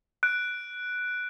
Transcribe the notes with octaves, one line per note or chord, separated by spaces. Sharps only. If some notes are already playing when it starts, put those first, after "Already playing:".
F#6 D7